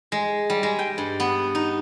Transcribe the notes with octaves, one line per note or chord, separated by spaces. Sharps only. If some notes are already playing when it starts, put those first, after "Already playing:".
G#3
G3
G#3
G5
G2
B3
D#4